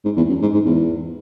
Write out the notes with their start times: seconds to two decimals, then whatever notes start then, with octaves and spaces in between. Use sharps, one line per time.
0.05 G#2
0.17 E2
0.29 F#2
0.41 G#2
0.54 G#2
0.66 E2